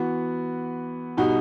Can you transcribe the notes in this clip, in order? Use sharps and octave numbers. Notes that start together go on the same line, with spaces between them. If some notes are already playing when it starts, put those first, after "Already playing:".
Already playing: E3 B3 F#4
B2 G3 D#4 F#4